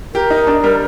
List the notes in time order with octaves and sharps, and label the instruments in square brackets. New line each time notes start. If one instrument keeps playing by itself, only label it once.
[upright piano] G4 [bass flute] A#4
[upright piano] D#4
D4
G3